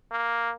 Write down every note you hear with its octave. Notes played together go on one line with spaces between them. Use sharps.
A#3